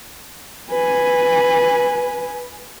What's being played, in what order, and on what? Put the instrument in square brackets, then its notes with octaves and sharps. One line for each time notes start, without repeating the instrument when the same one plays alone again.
[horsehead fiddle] B4 G#5